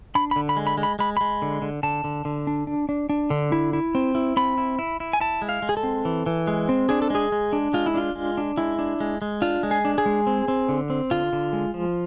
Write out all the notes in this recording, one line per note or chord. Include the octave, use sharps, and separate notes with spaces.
D4 B5
B5
D3
B5
G#3
B5
G#3
B5
G#3 B5
G#3 B5
D3
D3
D3 A5
D3
D3
D4
D4
D4
D4
D3
E4
E4
C4
E4
C4 B5
E4
E4
E4
G#5
E4 A5
G#3
F5
G#3
G#4
A4
C4
E3
E3
G#3
C4
D4 G#4
A4
G#3 G#4
G#3
D4
G#3 F4
E4
D4 F4
G#3
D4
G#3 E4
D4
G#3
G#3
D4 F4
G#3
G#4
D4
G#4
G#3
C4
C4
D3
C4
D3 F4
D3
G#3
F3